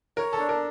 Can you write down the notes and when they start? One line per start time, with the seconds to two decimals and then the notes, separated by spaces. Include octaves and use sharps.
0.17 A#4 C#5
0.33 A4
0.38 D4
0.49 A#4